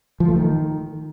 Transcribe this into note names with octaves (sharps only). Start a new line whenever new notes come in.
F3
A3
D#3